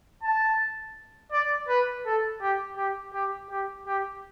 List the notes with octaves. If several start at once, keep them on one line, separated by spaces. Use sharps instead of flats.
A5
D5
B4
A4
G4
G4
G4
G4
G4